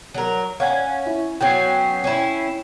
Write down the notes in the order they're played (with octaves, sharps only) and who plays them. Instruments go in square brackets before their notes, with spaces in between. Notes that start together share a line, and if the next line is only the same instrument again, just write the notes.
[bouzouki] F#3 A#4
[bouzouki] C#4 [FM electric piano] F5 F#5 G#5
[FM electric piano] E4
[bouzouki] F#3 B3 C#4 [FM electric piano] G5 C7
[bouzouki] C#4 E4